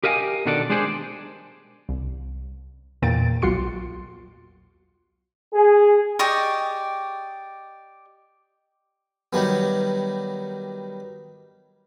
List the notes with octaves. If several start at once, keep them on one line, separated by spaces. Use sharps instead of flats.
G4 A#4 D#5 F5 G5 G#5
B2 D#3 D4 A4 C#5 D5
G#3 D4 G4 G#4 C5 D5
C2
E2 A#2 A#3 G5 A6 D7
B1 F#3 F4 F#4 C6 C#7
G#4
G4 D5 D#5 C#6
D#3 F#3 G3 B3